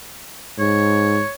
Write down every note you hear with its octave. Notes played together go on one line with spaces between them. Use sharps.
G#2 C#5